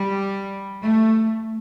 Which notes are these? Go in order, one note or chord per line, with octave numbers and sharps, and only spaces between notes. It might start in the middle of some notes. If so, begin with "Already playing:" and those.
Already playing: G3
A3